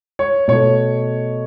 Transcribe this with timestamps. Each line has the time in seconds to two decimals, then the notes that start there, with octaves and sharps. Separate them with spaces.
0.19 C#5
0.48 B2 A3 C#5